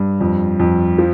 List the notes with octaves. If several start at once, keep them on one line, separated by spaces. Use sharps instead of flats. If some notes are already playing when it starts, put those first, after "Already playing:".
Already playing: G2
F2
F2
F3